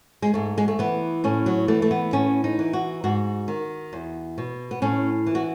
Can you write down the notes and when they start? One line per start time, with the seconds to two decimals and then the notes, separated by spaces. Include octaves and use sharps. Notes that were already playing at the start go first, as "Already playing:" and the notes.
0.22 G#3
0.34 G#2 A3
0.58 G#3
0.68 A3
0.79 E3 B3
1.24 A2 C#4
1.46 F#3
1.68 E3 A3
1.82 A3
1.91 B3
2.13 A2 C#4
2.44 D#4
2.59 E3
2.73 F#4
3.04 G#2 F#4
3.48 D#3
3.93 E2
4.38 B2
4.71 B3
4.82 A2 C#4
5.26 E3
5.35 F#4